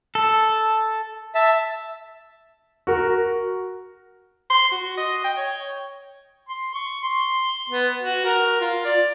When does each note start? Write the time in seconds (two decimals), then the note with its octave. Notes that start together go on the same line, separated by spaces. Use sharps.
0.15 A4
1.35 E5 A5
2.87 F#4 A#4
4.50 C6
4.72 F#4
4.97 D#5
5.24 G5
5.37 C#5
6.49 C6
6.74 C#6
7.02 C6
7.70 B3
8.02 F#4
8.25 A#4
8.61 F4
8.85 D5